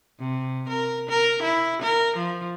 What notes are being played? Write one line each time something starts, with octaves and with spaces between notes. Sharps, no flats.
C3
A#4
A#4
E4
A#4
F3